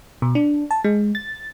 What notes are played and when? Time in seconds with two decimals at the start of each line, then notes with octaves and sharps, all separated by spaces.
0.22 B2
0.35 D4
0.71 A5
0.84 G#3
1.15 A6